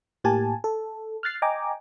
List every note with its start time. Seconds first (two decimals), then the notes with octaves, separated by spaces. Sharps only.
0.24 A2 A#3 G4 G#5 A5
0.64 A4
1.23 F6 F#6 A6 C7
1.42 D#5 G5 G#5 A#5 D6